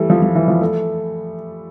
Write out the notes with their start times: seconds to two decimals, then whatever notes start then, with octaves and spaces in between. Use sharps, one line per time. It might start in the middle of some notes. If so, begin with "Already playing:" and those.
Already playing: E3 G3 A3
0.10 F3
0.22 F3
0.35 E3
0.48 F3
0.61 A3